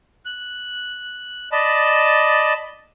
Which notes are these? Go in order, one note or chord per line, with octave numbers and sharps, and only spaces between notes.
F#6
D5 D#5 A5 B5